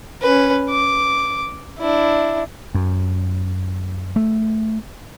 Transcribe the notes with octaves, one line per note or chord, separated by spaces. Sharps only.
C#4 B4
D6
D4 E4
F#2
A3